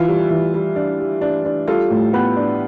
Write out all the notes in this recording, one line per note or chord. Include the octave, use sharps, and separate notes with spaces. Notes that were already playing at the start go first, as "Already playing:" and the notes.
Already playing: E3 F4
G3
E3
G3
D4
G3
D4
D4
G3 F4 A4
A2
B3 G4 B4
D4